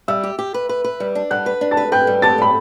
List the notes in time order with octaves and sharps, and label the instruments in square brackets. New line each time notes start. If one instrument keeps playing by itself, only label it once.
[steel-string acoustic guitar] G3 [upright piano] E5 E6
[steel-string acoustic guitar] G4
G4
B4
B4
B4
G3
D4
[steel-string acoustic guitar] G3 [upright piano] F#5 F#6
[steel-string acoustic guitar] B4
D4
[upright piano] A5 A6
[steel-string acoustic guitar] B4
[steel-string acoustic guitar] B4 [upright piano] G5 G6
[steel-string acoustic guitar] G3
[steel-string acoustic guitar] G4 [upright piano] A5 A6
[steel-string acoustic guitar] G3 [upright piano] B5